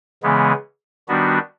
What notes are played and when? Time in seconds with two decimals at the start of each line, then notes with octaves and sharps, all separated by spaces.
0.23 C#3 E3 G#3 B3
1.08 D#3 G3 B3 D4 F#4